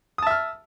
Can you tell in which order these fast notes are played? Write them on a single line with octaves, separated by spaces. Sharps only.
D#6 A5 E5 F6